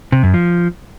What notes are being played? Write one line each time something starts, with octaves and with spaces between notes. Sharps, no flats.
C3
F#2
F3